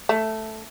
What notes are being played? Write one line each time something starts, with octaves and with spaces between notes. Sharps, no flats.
A3